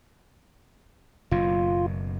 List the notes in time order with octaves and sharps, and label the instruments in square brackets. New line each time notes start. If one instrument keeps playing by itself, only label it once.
[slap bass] F#1 F#2 B2 [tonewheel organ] F4